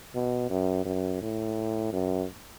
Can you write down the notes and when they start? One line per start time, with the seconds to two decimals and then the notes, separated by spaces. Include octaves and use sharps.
0.15 B2
0.50 F#2
0.86 F#2
1.22 A2
1.93 F#2